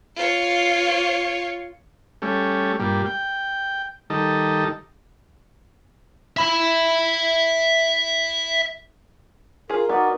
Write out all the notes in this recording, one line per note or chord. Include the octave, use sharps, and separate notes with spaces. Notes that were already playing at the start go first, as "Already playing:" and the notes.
F4 C#5
G3 A3 C#4
G2 A#2 G3
G5
D#3 G3 D#4 A4
E5 B5
F4 G#4 A#4
B3 D#4 F#4 D5